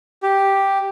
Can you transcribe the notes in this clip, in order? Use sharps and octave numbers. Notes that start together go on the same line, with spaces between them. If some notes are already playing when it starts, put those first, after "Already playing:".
G4